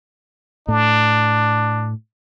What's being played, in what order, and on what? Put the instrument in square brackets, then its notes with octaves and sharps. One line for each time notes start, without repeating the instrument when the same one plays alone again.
[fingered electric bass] A2 [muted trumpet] D4